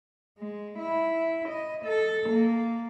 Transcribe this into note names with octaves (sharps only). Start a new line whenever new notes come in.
G#3
E4
D#5
A4
A#3